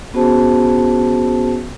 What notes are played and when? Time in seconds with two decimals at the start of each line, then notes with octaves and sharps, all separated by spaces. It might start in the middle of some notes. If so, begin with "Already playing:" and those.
0.14 B3 C#4 F#4 G#4 C5 A5